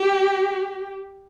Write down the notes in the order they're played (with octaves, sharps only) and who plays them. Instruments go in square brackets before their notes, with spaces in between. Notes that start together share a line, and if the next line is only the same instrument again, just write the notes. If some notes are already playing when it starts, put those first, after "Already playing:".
Already playing: [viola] G4